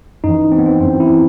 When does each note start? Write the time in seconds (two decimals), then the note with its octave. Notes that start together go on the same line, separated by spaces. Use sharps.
0.24 F#2 E3 D#4
0.52 C4
0.59 B3
0.66 C4
0.80 F#2 E3 C4
1.00 E4